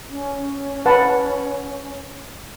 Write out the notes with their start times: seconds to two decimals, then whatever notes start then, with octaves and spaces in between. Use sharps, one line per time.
0.09 C#4
0.86 B4 F#5 A5